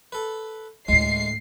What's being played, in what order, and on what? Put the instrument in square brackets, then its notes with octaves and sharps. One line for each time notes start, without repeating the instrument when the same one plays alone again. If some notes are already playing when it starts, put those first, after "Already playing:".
[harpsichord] A4 B4
[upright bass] D2 A2 [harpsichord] G#3 [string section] C7